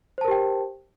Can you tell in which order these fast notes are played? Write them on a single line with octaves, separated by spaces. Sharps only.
C5 A5 A#4 G4 G5